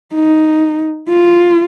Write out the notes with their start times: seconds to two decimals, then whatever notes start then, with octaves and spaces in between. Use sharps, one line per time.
0.14 D#4
1.09 F4